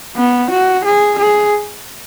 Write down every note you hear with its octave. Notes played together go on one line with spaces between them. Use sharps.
B3
F#4
G#4
G#4